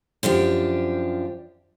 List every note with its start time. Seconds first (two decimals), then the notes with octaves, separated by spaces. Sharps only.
0.23 F#2 F3 D4 G4